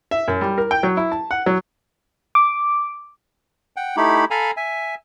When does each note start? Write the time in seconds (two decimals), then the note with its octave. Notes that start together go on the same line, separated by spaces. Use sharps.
0.11 E5
0.28 F#2
0.41 G3
0.58 A#4
0.71 G5
0.83 F#3
0.97 E4
1.12 A5
1.31 F#5
1.46 F#3
2.35 D6
3.76 F#5 G5
3.97 A3 D#4 E4 G4 B5
4.31 A4 F5 G#5 A#5 B5
4.57 E5 G#5